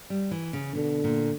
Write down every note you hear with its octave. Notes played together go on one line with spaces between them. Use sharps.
G3
E3
C#3
B2 D3
A#2